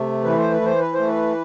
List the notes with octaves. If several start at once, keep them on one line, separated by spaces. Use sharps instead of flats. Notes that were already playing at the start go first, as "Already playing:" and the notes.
Already playing: C3 A3
E3 B4
C5
B4
E3 C5
B4
A3 C5
B4